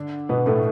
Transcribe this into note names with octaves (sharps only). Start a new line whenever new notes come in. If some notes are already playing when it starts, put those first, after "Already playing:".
Already playing: D3 D4
B2 B3
A2 A3